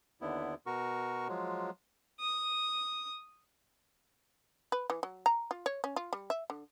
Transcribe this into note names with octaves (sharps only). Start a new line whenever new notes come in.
D#2 D3 B3 E4
B2 F#4 A#4 C#6
F3 F#3 G#3
D#6
B4
E3
F#3
A#5
F4
C#5
C#4
F4
G3
E5
D3